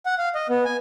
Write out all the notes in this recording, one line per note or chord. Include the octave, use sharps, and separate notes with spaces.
F#5
F5
D#5
B3
G#5